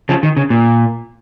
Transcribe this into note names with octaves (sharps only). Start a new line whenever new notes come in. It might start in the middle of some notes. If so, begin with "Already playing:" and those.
C#3 F3
D#3
C#3
A#2